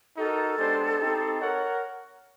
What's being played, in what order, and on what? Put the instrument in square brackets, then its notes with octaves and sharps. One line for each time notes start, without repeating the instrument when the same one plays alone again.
[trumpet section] D#4 F#4 A#4 [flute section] A4
[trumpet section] G#3 B3 D4 G4 C5
C4 D#4 G4
[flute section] A#4 [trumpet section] C#5 F#5